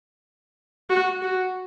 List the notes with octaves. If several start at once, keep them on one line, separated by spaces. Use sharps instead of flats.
F#4
F#4